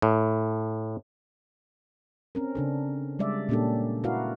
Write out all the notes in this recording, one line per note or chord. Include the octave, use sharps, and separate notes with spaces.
A2
C4 C#4 A#4
C#3 D4 A4
G3 G#3 D5 E5
A#2 A#3 C#4 D4 G4 A4
E4 F#4 A#4 B4 D5 F5